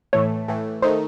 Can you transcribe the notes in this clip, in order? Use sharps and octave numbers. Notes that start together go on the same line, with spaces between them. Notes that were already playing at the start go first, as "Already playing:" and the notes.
A2 E3 A3 C#5
A2 E3 A3
D#3 A3 D#4 C5